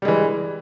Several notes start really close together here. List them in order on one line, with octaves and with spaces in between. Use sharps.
G3 G#3 E3